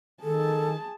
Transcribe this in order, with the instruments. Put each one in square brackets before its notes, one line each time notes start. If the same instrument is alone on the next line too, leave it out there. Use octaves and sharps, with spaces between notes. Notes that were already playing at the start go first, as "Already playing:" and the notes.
[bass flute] D#3 [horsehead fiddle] G#4 A5 [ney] A4